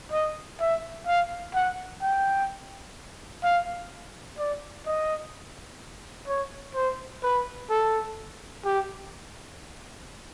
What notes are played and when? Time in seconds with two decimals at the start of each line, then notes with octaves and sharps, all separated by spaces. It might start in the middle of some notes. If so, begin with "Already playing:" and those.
0.12 D#5
0.60 E5
1.07 F5
1.54 F#5
2.02 G5
3.44 F5
4.39 D5
4.87 D#5
6.28 C#5
6.75 C5
7.23 B4
7.70 A4
8.65 G4